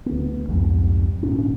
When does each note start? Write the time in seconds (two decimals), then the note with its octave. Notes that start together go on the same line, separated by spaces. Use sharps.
0.06 D2 B3
0.49 C2 F2 G#2 C3
1.23 G#1 A#2 C#4 D4